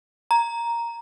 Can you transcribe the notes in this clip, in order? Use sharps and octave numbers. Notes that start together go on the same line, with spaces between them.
A#5